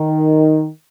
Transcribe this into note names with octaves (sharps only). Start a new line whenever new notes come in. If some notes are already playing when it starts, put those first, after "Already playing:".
Already playing: D#3